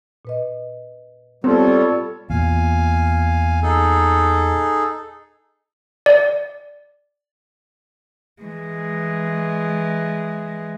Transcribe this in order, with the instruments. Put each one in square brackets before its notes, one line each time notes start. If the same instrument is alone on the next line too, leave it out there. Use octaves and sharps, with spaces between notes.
[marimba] A#2 B4 D#5
[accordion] G3 [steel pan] B3 C4 C5 [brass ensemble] F4 A4 C#5
[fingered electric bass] E2 A#2 [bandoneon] F5 G#5
[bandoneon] D#4 G#4 A4
[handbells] D5
[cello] E3 G#3